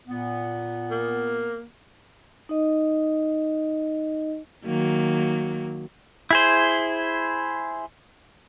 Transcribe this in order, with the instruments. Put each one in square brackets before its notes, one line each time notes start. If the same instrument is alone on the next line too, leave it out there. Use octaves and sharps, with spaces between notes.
[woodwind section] A#2 B3
[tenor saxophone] A#3
[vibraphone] D#4 D#5
[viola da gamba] D#3 F#3 A#3
[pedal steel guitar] E4 G#4 C5